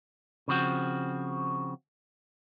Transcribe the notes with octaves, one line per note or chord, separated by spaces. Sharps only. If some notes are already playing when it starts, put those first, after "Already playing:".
C#3 F3 C4 F#4